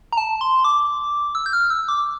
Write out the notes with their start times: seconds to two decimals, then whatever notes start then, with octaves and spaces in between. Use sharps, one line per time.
0.12 A#5
0.17 A5
0.41 C6
0.65 D6
1.35 E6
1.46 G6
1.53 F6
1.70 E6
1.88 D6